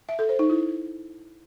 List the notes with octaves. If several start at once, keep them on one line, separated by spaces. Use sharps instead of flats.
E5
A4
C5
D#4
E4